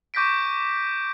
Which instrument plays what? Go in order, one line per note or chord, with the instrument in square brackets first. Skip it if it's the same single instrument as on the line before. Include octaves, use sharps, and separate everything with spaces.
[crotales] C#6 D6 G6 A#6 B6 D7